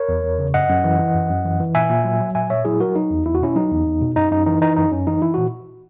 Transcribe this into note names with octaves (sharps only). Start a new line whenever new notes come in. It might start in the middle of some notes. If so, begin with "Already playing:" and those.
Already playing: A#4 C#5
E2
E2
C#3
F#2 D#5 F#5
F#2
E3
E3
F#2
F#2
E3
E3
A#2 E5 G#5
A#2
F#3
F#3
A#2 E5 G#5
A#2 C#5 E5
F#3 E4 G#4
F#3 F#4 A#4
F#3 D#4
E2
E2 E4
F#4
B2 C#4 E4
F#3 D#4
E2
E2
B2
F#2 D#4
F#2 D#4
E3 D#4
E3 D#4
F#2 D#4
F#2 C#4
E3 D#4
E3 E4
A#2 F#4